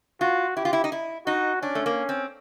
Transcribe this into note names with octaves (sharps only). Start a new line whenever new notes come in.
F4 F#4
E4 G4
F4
E4
D#4
E4
D#4 F#4
C#4 D4
A3
A#3
C4